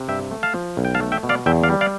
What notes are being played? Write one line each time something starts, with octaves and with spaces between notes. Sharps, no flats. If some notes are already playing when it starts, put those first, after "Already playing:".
Already playing: C3
G2 E5 G5
A3
F5 A5
F3
B1
G5
F5 A5
A3
E5 G5
B2
D5 F5
E2 E5 G5
D5 F5
G3
D5 F5